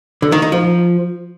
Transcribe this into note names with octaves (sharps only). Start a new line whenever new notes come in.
D3
D#3
D#4
F3